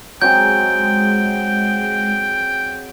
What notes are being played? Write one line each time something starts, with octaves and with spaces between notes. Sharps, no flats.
F#3 G#3 C4 G#4 G5 G6